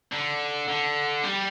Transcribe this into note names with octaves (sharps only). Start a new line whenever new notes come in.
D3
D3
G3